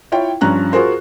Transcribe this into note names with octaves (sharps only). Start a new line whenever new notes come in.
E4 F4 C#5 G5
G2 F3 C#4 A#5 F#6
F4 F#4 G#4 A#4 C5